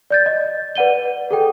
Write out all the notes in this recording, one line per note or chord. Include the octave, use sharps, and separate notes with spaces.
D5 G6 A6
D#5
B4 D5 F#5 D#7 G7
G#4 A4 G5